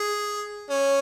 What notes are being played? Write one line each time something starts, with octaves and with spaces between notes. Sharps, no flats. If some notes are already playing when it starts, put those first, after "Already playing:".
Already playing: G#4
C#4